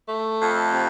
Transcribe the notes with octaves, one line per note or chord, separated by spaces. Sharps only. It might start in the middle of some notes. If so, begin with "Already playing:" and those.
A3
F2
C3